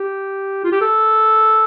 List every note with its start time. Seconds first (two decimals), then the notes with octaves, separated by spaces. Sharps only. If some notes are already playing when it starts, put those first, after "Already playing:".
Already playing: G4
0.64 F4
0.72 G4
0.81 A4